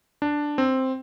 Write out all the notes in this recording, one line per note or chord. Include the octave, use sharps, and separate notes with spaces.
D4
C4